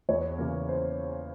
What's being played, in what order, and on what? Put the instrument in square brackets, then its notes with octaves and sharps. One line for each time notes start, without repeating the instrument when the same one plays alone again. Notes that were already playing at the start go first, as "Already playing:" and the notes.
[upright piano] E2 C#5
C#3 E3 A#3
C5